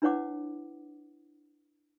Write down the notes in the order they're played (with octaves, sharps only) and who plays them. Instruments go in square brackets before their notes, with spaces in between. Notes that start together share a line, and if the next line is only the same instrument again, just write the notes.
[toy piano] D4 E4 B4 C#5 F#5 D6